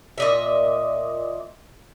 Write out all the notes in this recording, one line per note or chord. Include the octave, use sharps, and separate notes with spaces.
A#2 D#5 E5